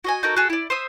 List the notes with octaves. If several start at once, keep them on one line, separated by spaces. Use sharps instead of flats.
F#4 D#5 G#5
D#4 F#4 A4 A#4
F#4 G#4 A4
E4 D5
C5 E5 D#6